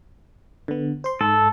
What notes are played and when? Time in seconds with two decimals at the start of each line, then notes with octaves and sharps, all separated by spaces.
0.68 D3 B3
1.04 C5 C6
1.21 G#2 A4